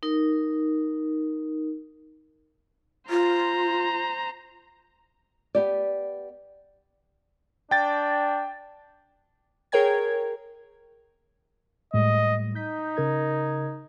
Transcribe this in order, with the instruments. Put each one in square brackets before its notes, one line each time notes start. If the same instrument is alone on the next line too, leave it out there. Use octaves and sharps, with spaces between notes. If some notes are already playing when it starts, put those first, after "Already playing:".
[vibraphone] D#4 A#4
[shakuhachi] F4 [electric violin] C5 A#5
[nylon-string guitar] B3 G4 D5
[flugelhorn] D4 [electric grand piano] G5 A6
[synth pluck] G#4 A#4 C#5 G5 G#6
[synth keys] A2 G3 G#3 [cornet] D#5
[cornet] D#4 [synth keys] G6 B6
[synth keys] C#3 A#4 G#6